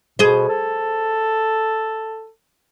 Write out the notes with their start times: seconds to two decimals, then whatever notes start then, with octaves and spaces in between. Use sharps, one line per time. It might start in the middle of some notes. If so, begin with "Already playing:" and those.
0.19 B2 G#4 C5
0.49 A4